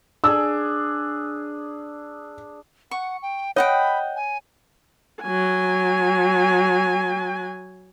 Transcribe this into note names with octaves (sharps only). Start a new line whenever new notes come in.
D4 G#4 E6
F#5 C#6
G5
C#5 D#5 F#5 G5 B5
G#5
F#3 G#5